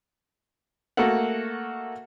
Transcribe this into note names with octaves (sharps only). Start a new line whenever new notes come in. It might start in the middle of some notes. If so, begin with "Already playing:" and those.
A3 A#3 F#4 A4 A#4 F#5